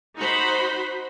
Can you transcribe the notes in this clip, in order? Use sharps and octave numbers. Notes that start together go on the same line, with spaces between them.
D#4 F#4 C5 F#5 B5